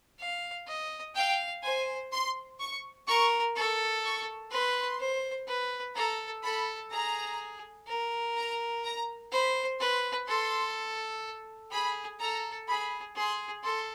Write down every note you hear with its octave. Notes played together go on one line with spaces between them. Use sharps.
F5
D#5
F5 G5
C5 G#5
C6
C#6
A#4 C#6
A4 C#6
C#6
B4 C6
C5
B4
A4 A#5
A4 B5
G#4 A#5
A#4
A#5
A#5
C5 B5
B4 C6
A4 C6
G#4 B5
A4 A#5
G#4 B5
G#4 C6
A4 C6